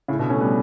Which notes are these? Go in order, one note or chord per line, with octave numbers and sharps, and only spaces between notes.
A2 C#3
B2 D3
A3 C#4
G3 B3